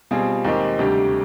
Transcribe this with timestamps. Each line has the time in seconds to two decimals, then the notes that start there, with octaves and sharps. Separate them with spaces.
0.11 B2 G3 C4 F4 G#4
0.45 D#2 D#3 G#3 C4 G4
0.79 D2 C3 G3 D4 G4